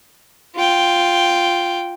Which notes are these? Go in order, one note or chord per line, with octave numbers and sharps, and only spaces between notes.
F4 G5